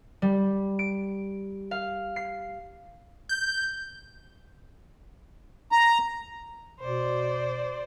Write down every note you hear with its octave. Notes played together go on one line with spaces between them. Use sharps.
G3
D7
F5
C7
G6
A#5
B2 C5 D5